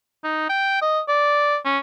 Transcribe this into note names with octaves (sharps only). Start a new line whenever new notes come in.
D#4
G5
D#5
D5
C#4